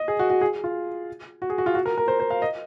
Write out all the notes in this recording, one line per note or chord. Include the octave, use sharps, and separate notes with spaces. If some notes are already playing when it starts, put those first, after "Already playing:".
Already playing: D#5
G#4
F#4
F#4
G#4
F4
F#4
G#4
F#4
F4
F#4
A#4
A#4
C5
C5
F5
D#5